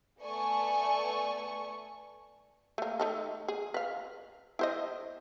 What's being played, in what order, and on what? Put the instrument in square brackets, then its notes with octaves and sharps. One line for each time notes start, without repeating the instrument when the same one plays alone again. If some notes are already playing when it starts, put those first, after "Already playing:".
[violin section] A3 B3 D5 G#5 C#6
[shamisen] A3 A#3
A3 D#4 A4
G#4
B4 F5
E4 C5 D#5